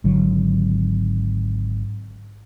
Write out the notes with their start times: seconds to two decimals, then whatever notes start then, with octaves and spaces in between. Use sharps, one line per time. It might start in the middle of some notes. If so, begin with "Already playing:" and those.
0.04 G#1 D3 F#3